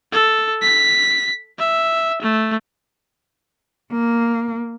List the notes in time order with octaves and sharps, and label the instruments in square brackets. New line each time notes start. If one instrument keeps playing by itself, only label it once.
[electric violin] A4
B6
E5
A3
[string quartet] A#3